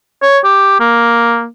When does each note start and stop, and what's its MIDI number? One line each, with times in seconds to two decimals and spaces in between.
0.22 0.39 73
0.44 0.79 67
0.80 1.47 58